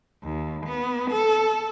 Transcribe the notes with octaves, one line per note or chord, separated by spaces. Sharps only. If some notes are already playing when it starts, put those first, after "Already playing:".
D#2
B3
A4